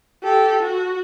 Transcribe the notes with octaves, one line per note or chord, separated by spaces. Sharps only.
G4 A4
F#4